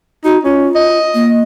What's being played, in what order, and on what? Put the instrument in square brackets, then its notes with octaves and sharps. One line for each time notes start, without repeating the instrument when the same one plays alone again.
[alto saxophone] D#4 [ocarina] F#4
[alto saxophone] C#4 [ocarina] F4
[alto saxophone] D#5
[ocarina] A#3